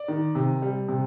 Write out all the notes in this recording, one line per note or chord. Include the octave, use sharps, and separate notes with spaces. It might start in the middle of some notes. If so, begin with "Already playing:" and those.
Already playing: D5
D#3
C3
G3
C3